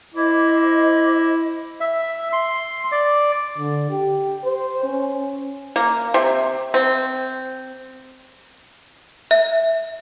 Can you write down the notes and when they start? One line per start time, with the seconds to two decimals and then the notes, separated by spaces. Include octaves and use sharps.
0.14 E4 C5 D#5 D6
1.80 E5
2.33 C6
2.92 D5
3.58 D3
3.90 G4
4.44 C5
4.84 C#4
5.76 A#3
6.14 C3
6.74 C4
9.31 E5